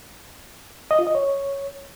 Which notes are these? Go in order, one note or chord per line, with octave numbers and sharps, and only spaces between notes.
D#5
F4
D#5
C#5